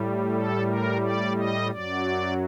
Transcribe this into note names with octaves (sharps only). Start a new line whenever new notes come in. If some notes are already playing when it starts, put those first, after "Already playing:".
Already playing: A2 G3
A4
A#4
D5
D#5
F#2 F#3 D5